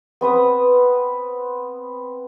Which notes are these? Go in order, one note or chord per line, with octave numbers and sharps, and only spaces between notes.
B3 C4 B4 D#6